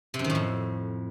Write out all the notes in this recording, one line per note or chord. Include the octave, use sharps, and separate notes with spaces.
C3
F#2
D#3
A2
F2